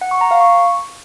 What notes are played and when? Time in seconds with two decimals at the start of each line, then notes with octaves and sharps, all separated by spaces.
0.01 F#5
0.11 C#6
0.21 A#5
0.31 F5
0.41 C#6